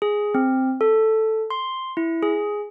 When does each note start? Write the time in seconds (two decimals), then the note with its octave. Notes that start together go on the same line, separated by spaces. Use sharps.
0.02 G#4
0.35 C4
0.81 A4
1.50 C6
1.97 E4
2.23 G#4